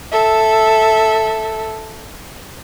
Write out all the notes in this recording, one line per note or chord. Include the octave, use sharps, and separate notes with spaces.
A4 E5